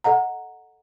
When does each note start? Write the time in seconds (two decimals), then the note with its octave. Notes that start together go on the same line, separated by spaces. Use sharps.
0.04 A4 D#5 F#5 A#5